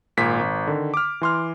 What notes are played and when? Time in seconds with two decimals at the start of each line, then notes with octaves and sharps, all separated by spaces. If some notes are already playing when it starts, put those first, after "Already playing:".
0.17 G#1 A#2 B6
0.39 G#1
0.67 D3 D#3
0.94 D6 F6
1.21 E3 C6 F6